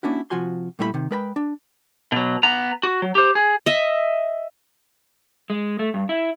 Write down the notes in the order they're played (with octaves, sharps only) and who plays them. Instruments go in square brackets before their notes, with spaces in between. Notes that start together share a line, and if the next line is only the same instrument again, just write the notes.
[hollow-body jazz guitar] A#3 C#4 D4 E4 F#4
C3 F3 F4 F#4 G#5 C6
A#2 G3 A3 E4 C#5 B5
C3 D#3
G#3 A#4 B4 G5 A5 B5
D4
[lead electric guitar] B2 F#3
B3 A#5
F#4
F#3
G4 C5
G#4
[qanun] D#5 E5
[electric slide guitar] G#3
A3
G2
E4